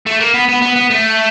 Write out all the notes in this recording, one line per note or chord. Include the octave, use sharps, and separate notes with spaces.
A3
A#3
B3
B3
B3
B3
A3